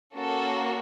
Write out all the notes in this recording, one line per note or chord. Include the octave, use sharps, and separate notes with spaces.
A#3 C#4 F#4 A4